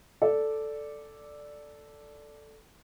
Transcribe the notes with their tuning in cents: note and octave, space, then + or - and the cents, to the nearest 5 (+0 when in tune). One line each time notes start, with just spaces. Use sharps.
A4 +0 D5 +0